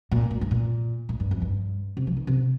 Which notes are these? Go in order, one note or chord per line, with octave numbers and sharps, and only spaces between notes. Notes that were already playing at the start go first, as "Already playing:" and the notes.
A#2
A#2
G2
A#2
A#2
G2
F2
G2
C3
F3
D#3
C3